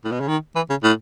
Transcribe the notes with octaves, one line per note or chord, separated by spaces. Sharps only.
A2
B2
C#3
D#3
E3
C#3
A2